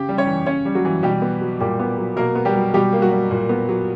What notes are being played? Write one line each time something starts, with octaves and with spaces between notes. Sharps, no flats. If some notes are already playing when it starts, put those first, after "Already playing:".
Already playing: C#3 G4 G5
G3
C#4 C#5
E3
C#3 C#4 C#5
G3
F#3 F#4
E3
B2 G3 G4
B3
F#3
A#2 G3 G4
B3
F#3
B2 A#3 A#4
B3
G3 G4
F#3
B2 G3 G4
A#3
F#3 F#4
G3
A#2
B3
F#3